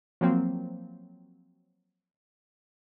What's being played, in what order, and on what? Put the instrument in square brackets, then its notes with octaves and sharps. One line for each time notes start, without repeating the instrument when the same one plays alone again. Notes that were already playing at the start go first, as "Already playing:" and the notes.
[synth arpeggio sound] F3 F#3 A#3 C4